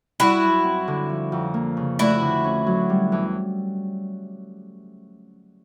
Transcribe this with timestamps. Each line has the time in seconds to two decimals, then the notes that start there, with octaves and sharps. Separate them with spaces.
0.20 G3 E4 F#4
0.43 F#2
0.64 C4
0.88 D3
1.10 F3
1.32 F2
1.54 A#3
1.77 C#3
1.99 A3 E4 F#4
2.21 D3
2.44 C#4
2.67 F#3
2.90 G3
3.12 E2